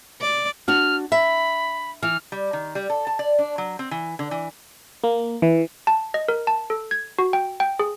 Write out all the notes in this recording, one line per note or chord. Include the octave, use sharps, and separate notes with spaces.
D5
D4 F#4 F6
E5 B5
E3 F6
G3
D#3
G3
A4
A5
D5
D4
F#3
C4
E3
D3
E3
A#3
E3
A5
D#5
A#4
A5
A4
G#6
F#4
G5
G5
G#4